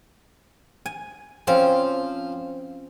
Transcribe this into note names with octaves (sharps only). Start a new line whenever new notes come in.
G#5
F3 C4 C#4